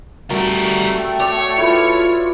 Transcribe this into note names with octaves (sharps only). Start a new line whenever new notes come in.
G3 A3 F#4 A#4
G5
C#5 D5
E4 F4 A4 B4